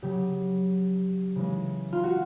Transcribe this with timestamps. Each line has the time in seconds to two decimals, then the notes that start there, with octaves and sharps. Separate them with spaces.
0.02 C#3 F#3 G4
1.36 C#3 E3 G#3
1.93 F4
2.03 F#4